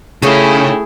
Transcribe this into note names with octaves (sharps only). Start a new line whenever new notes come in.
C#3 A3 D#4 E4 G4 G#4 C#5